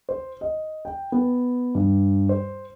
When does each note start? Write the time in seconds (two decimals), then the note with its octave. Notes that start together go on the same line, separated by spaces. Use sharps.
0.09 C5
0.41 D#5
0.85 G5
1.12 B3
1.75 G2
2.29 C5